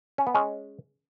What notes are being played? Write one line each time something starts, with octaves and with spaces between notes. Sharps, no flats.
C#4
B3
G#3 C#4